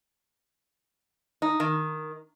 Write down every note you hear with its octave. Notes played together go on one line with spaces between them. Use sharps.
D#4
D#3